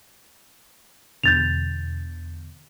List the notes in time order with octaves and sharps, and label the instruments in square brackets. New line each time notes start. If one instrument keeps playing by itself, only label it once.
[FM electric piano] E2 B2 D3 [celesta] G6 A6 F7